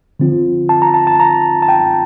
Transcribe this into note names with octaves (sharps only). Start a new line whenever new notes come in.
D3 F3 C4 F4
A5
A#5
A5
A5
A#5
A5
G5